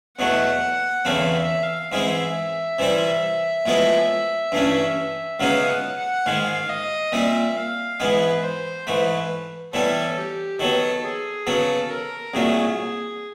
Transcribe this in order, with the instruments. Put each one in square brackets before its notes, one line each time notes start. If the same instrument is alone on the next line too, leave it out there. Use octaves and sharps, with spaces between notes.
[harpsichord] E2 B2 F#3 A3 [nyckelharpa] F#5
[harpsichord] E2 C#3 E3 A3 C4 [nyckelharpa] F5
[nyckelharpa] E5
F5
[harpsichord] G#2 E3 G#3 C4 [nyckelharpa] E5
[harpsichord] C3 E3 G3 C4 E4
A2 F3 G#3 B3 E4
G2 E3 A3 C#4
[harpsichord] C#2 C#3 F#3 B3 D#4 [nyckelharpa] F5
[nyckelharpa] F#5
F#5
[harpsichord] G#2 D#3 G#3 [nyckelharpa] F5
[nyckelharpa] D#5
[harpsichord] A#2 G3 C4 [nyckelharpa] E5
[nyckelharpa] F5
[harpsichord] G#2 E3 G#3 B3 [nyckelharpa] B4
[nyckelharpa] C5
[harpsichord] G#2 E3 A3 [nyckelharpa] B4
[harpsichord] A2 E3 G3 B3 [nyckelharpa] A4
[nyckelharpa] G4
[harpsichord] D#3 F#3 B3 [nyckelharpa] A4
[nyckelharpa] G#4
[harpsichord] C#3 F#3 B3 [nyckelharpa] A4
[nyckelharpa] A#4
[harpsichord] C2 A#2 F#3 A3 [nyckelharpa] G#4